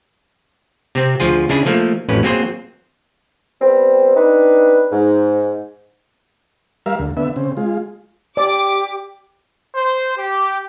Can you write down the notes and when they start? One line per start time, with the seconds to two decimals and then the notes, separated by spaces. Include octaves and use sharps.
0.95 C3 C4
1.20 D2 F3 F4 G#4
1.49 C#3 D4 E4 G#4
1.66 F3 A3 A#3
2.09 A1 F2 A2 C#4 B4
2.23 F#3 A#3 C4 G#4 C5
3.61 G3 B3 C4
4.16 C4 D4 D#4 B4
4.91 G#2
6.86 G3 A#4 E5 F5
6.99 D2
7.17 D3 B3 E5
7.36 C#3 C4
7.57 G#3 F4
8.37 G4 D5 D6
9.75 C5
10.17 G4